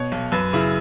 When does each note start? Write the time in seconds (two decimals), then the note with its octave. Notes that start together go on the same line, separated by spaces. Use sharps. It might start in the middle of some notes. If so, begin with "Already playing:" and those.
Already playing: B2 C#5
0.12 B1
0.32 F#2 B4
0.53 C#3 E4